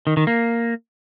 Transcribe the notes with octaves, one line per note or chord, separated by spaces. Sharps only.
D#3
D#3
A#3